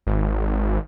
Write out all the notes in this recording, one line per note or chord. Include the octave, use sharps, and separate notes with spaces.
G#1